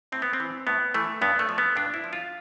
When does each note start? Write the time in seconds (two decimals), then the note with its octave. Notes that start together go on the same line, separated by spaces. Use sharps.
0.12 A2 C4
0.22 B3
0.33 C4
0.40 E3
0.67 A2 B3
0.94 E3 A3
1.21 G2 B3
1.39 A3
1.49 F3
1.58 B3
1.76 G2 D4
1.94 E4
2.04 F3
2.13 F4